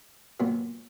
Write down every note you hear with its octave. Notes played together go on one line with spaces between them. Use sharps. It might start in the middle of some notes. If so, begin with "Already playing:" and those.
A#2 F#3 B3